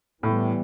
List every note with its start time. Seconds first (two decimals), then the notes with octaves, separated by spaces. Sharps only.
0.23 A2 E3 G3 B3